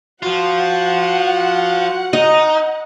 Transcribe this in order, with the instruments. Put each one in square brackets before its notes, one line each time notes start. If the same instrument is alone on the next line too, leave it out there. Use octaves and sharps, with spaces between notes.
[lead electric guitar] F3 F4 [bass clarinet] F#4 [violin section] F#5
[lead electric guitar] D#4 [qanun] D#5